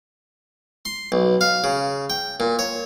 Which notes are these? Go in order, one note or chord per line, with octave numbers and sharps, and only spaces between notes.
C6
B1
F5
C#3
G5
A#2
C#5